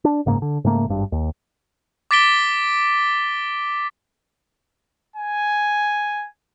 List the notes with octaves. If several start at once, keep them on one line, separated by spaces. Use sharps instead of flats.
D4
F#1 G#2 C#3 A#3
D3
G#2 C#3 A3 A#3
G#1 G2
D#2
D6 A6 B6 D7 G7
G#5